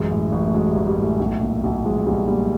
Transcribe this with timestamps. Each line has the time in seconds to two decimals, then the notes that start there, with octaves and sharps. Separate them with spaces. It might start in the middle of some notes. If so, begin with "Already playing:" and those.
Already playing: A1 F#2 G#3
0.11 A2
0.32 A1
0.47 A3
0.54 F#3 G#3
0.71 A1 G3
0.87 G3
0.98 A2
1.03 A3
1.19 B1 A3
1.41 A#2
1.64 B1
1.85 F3 G#3
2.06 B1 G3
2.28 A#2 G3